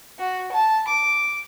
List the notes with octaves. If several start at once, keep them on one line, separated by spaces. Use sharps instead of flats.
F#4
A5
D6